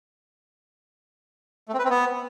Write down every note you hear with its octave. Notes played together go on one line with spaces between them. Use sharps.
A3
C4
B4
C4
B3